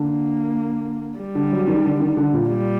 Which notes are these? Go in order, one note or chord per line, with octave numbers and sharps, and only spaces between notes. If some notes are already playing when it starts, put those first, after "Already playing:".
Already playing: D3 A#3
G3
D3
F#3
D#3
D3
D#3
D3
A#2
G3